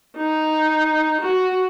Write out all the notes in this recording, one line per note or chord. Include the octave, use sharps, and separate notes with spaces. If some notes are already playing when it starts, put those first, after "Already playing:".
D#4
F#4